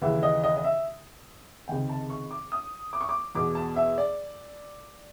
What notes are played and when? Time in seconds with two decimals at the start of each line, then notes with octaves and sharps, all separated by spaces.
0.01 D#2 C#3 E3 E5
0.23 D#5
0.44 D#5
0.57 D#5
0.64 E5
1.68 C#2 C3 D#3 G5
1.89 A5
2.10 C#6
2.31 D6
2.52 D#6
2.93 D6
3.01 C#6
3.09 D6
3.35 E2 B2 D6
3.55 A5
3.76 E5
3.98 D5